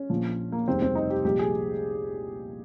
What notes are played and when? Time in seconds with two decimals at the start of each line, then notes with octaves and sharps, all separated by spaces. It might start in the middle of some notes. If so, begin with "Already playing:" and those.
Already playing: C#4
0.10 A#1 A#2 F3
0.52 A#3
0.68 F1 D#2 C#3 G3 C4
0.82 C4
0.95 D#4
1.10 G4
1.24 C2 A#2 F3 G#3 G4
1.39 G#4